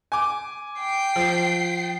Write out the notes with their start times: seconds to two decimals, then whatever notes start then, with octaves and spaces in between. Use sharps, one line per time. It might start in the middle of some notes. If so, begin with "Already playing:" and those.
0.12 G#5 D6
0.79 G5 C7
1.16 F3